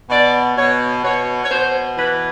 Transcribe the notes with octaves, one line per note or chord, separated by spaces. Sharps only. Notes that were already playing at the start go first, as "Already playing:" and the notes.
B2 D5
B2 C#5
B2 C#5
C#5
B2 C5
E3 B4